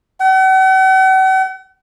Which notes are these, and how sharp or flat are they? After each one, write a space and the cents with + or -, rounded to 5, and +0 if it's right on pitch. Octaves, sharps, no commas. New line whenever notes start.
F#5 +40